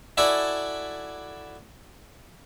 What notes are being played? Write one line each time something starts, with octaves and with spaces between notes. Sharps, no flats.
E4 F#4 A4 D5 G#5